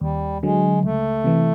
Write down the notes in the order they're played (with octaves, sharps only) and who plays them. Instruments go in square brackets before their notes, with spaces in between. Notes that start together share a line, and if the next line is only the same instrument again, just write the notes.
[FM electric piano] D#2 [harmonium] G3
[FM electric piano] D3 F#3 [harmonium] G#3
[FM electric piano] C#2 [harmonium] A3
[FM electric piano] C3 E3